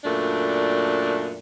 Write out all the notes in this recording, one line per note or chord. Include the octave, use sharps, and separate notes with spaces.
F#2 A#2 A3 D4